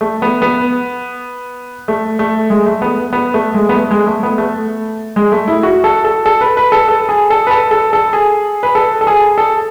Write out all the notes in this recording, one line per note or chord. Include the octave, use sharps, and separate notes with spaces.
A3
B3
B3
A3
A3
G#3
A3
B3
B3
A3
G#3
B3
A3
G#3
A3
B3
A3
G#3
A3
E4
F#4
A4
A4
A4
B4
B4
A4
A4
G#4
A4
B4
A4
A4
A4
G#4
B4
A4
A4
G#4
A4